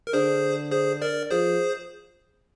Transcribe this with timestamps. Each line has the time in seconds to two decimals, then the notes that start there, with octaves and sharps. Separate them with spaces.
0.07 A#4
0.13 D3 G#4 C5
0.71 G#4 C5
1.02 A#4 D5
1.31 F3 G#4 C5